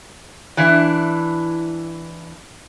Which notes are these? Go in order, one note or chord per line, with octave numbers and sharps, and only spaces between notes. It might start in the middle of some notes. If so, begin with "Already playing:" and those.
E3 D4 E4